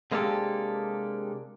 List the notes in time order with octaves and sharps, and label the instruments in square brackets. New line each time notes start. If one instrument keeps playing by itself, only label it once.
[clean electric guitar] C3 G#3 A#3 D4 G4 A4